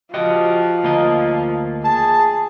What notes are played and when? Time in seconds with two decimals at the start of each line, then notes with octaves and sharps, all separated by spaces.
0.14 F3 F#4 G4 D#5
0.83 D2 A#3 D#5
1.84 G#4 A5